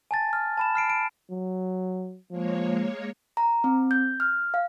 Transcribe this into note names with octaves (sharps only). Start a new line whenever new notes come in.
G#5 A5 A6
F6
A5 B5 E7
F6 C7 D7
D7
F#3
F3 G#3 A#3 C#5
A#5
C4
G6
F6
F5